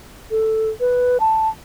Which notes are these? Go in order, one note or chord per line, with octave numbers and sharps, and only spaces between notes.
A4
B4
A5